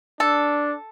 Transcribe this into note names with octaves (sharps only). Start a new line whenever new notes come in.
D4 A4